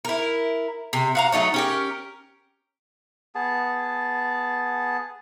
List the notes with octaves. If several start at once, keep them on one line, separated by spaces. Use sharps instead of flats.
E4 A#4
C3
F#4 F5 A#5
F#3 A3 D#4 C#5
C#4 G4 A#4
B3 G#4 A5